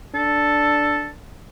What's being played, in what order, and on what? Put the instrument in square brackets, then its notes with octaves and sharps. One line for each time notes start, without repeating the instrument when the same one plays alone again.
[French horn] D4 [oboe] A4